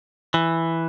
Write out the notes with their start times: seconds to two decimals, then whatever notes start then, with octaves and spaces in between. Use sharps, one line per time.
0.34 E3